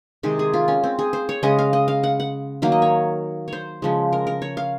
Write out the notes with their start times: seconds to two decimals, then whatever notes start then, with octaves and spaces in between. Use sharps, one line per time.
0.23 C3 D#3 G#3 G#4
0.39 G#4
0.54 F4
0.68 C#4
0.84 C4
0.99 G#4
1.13 C5
1.29 C#5
1.43 C#3 G#3 D#5
1.59 F5
1.73 D#5
1.88 F5
2.03 F#5
2.20 F#5
2.62 D#3 F#3 A#3 F5
2.72 D#5
2.82 C#5
3.48 C5 C#5
3.82 C#3 F3 G#3
4.13 A#4
4.27 A#4
4.42 C#5
4.57 F5